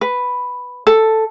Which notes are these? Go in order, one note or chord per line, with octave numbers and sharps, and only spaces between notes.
B4
A4